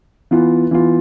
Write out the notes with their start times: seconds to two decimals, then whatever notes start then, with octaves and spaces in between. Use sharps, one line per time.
0.31 E3 B3 F4
0.71 E3 B3 F4